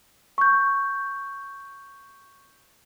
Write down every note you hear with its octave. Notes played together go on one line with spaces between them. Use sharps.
C#6 G6